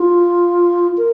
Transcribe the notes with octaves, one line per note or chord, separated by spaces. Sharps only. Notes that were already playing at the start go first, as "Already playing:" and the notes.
Already playing: F4
A#4